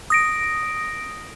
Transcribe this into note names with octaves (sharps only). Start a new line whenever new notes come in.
D#6 A#6 D7